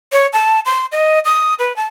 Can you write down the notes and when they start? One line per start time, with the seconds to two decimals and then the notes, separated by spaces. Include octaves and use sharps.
0.12 C#5
0.33 A5
0.65 C6
0.92 D#5
1.25 D#6
1.59 B4
1.76 A5